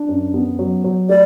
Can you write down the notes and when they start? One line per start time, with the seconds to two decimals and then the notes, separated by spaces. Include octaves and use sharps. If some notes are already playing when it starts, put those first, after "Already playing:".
Already playing: D4
0.09 F#2
0.34 B3
0.59 F#3
0.84 F#3
1.09 A3 D5